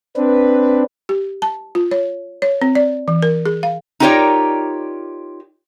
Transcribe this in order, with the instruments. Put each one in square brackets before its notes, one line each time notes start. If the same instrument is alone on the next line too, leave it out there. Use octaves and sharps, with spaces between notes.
[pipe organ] C4 D4 [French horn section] B4
[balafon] G4
A5
F4
C#5
C#5
C4
D5
E3
A#4
G#4
F5
[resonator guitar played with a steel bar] D#4 F4 G4 A#4 C#5 D5